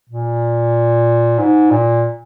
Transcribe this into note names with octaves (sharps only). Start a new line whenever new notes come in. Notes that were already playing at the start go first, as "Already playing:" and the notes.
A#2
G#2
A#2